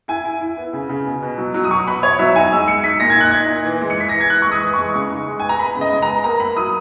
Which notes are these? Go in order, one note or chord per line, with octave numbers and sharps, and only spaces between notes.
E4 G#5
E4
E4
B3
C#3
C#3
B2
B2
F#3
F#3
D#6
B2 C#6
B2 B5
B2 C#5
F#3 E5
D#4 G#5
G#3 E6
G#3 C#7
D#4 B6
A#2 A#6
G#6
D#4 F#6
D#4 G#6
A#2
E3
G#3
C#7
E3 B6
E3 A#6
G#6
E3 F#6
G#3 C#6
D#6
E3
G#3 C#6
C#3 C#6
D#4
G#3
B3 G#5
A#5
B3 B5
C#3
D#5
G#3
A#5
B3
A#3 A#5
A#3 B5
F#3 D#6